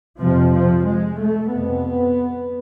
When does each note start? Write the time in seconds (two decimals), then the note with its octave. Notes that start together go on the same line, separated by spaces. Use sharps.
0.18 F2 C3 F3
0.52 F3
0.85 G#3
1.18 A3
1.51 F2 C3 B3